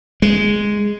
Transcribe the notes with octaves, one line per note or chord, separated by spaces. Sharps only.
G#3